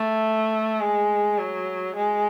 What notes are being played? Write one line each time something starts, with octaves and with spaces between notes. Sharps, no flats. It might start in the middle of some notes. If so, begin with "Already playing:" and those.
Already playing: A3
G#3
F#3
G#3